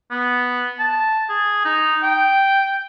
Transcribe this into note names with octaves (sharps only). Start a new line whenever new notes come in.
B3
A5
G#4
D#4
G5